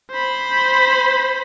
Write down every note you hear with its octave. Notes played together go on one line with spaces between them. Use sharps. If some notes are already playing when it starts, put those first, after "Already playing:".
C5 B5